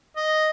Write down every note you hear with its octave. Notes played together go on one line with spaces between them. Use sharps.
D#5